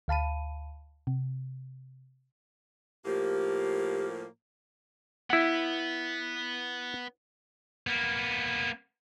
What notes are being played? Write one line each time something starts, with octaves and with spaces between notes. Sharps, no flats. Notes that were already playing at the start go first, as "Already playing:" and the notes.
D2 F5 A5 B5 D#7
C3
A2 F3 A#3 G4
B3 E4 F#5
A#3 B3